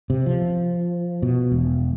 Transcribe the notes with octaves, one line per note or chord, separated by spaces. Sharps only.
C3
F3
B2
E1